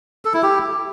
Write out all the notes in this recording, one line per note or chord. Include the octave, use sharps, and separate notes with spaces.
A4
E4
G4